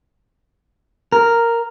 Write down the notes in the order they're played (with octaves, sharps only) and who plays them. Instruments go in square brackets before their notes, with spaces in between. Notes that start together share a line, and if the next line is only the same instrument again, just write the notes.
[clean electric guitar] A#4